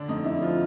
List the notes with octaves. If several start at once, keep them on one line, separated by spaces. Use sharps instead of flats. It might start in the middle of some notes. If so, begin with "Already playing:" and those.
Already playing: D3 D4
F2 D#4
F2 E4
F3 F4